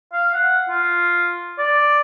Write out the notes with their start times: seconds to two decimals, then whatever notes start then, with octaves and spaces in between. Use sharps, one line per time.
0.13 F5
0.33 F#5
0.69 F4
1.59 D5